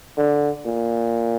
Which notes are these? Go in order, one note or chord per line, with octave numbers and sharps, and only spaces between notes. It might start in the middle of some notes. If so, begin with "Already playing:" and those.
D3
A#2